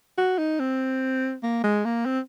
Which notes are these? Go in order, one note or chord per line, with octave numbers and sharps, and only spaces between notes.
F#4
D#4
C4
A#3
G#3
A#3
C4